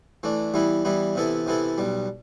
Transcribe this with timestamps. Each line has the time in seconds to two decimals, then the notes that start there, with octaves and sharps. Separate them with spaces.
0.23 E3 A3 D4
0.54 E3 G3 B3 E4
0.85 E3 G3 B3 E4
1.15 C3 E3 B3 E4 A4
1.46 C3 E3 B3 E4 A4
1.78 B1 B2 G3